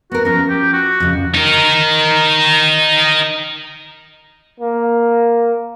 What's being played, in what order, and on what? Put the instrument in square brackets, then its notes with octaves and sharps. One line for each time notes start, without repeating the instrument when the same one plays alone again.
[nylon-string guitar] B3 A#4 [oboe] F#4
[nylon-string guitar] F3 C#4 [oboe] A#4
[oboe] G4
F#4
[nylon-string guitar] F2 C#3
[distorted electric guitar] D#4 A#4
[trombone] A#3